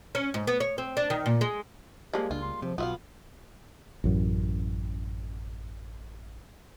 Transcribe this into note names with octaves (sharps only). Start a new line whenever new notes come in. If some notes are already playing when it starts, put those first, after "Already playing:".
C#4
G#2
B3
C#5
C4
D4
D#3
A#2
G#3
F3 G3 G#3 A#3 G4
C#2 D4 F4
C6
C3 F3
B1 B2 B3 F4 E5 F5
A1 F#2